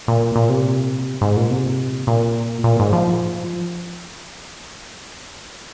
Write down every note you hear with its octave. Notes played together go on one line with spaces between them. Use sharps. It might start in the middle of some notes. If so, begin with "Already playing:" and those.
A#2
A#2
C3
G#2
A#2
C3
A#2
A#2
G#2
F3